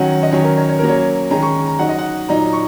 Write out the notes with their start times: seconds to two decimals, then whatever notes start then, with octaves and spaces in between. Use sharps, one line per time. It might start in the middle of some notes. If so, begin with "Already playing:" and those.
Already playing: D#3 F#3 C#4 F#5
0.23 D#5
0.32 D#3 F#3 C#4 C#5
0.44 A#4
0.57 C#5
0.69 C#5
0.79 F#3 A#3 C#4 A#4
0.89 C#5
1.30 D#3 G#3 C#4 A#5
1.43 C#6
1.67 A#5
1.79 F#3 D#4 F#5
1.89 D#5
1.99 F#5
2.28 A#2 F#3 D#4 A#5
2.53 C#6